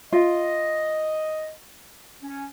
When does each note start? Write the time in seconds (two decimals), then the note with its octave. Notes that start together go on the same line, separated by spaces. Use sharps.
0.13 F4 D#5
2.22 C#4